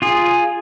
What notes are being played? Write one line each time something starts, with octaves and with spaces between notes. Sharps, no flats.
F4 G#4